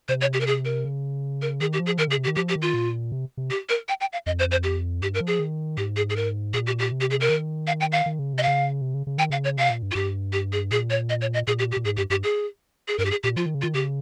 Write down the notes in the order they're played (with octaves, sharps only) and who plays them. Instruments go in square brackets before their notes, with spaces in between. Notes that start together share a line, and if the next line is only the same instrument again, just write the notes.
[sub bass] C3 [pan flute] C5
[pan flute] C#5
G4
A#4
G#4
A#4
[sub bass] C#3
[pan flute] A#4
[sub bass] D#3 [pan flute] G#4
[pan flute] G4
[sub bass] F3
[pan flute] G#4
[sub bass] D#3 [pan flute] A#4
[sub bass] C#3 [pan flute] G#4
[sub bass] C3
[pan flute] G4
[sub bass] D#3
[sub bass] F3 [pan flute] G4
[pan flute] G4
[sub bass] D#3
[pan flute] F4
[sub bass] A#2
C3
C3
[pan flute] G4
A#4
G5
G5
F5
[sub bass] F2 [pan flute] D#5
[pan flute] C5
C5
G4
[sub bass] G2 [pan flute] G4
[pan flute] A#4
[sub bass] F3
[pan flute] G#4
[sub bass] D#3
[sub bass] G#2 [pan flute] G4
[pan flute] G#4
G#4
A#4
[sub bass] A#2 [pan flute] G#4
[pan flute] G4
G4
[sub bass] C3
[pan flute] G4
G#4
A#4
[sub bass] D#3
[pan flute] F5
G5
F5
[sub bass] D#3
C#3
[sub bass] C3 [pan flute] D#5
[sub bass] C#3 [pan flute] F5
[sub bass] C3
C#3
C#3
[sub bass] D#3 [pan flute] G5
[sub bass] C#3 [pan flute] F5
[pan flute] C#5
[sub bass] C3 [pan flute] F5
[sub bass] A#2
G2
[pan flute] F4
[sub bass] G2 [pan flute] G4
[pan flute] G4
G#4
[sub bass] A#2 [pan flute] G#4
[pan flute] C#5
D#5
C#5
D#5
[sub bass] A#2 [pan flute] G#4
[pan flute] G4
G4
[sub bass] A#2
[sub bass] G#2 [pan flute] G#4
[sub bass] G2 [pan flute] G4
[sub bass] G2 [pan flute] G4
[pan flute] G#4
G#4
[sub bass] G2 [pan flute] A#4
[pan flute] G4
G#4
[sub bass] A#2 [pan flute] G4
[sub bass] F3 [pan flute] F4
[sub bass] D#3
C#3
[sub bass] D#3 [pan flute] F4
[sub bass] C#3 [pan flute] G4